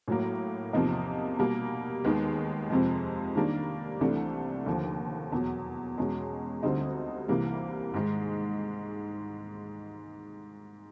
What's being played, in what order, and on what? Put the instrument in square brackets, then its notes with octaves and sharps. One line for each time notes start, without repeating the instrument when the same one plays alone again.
[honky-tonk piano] A2 F#3 A#3
E2 C3 F3 A#3 D#4
B2 G3 A#3
D#2 D#3 G#3 B3
F2 C3 F3 G#3
D#3 G3 A#3 D4
C2 C3 E3 A3 D4
D#2 D3 F3
E2 B2 F#3
E2 B2 G#3 C#4
D2 D3 G3 C4 D#4
C2 C3 E3 G3 A#3
G#2 D#3 G#3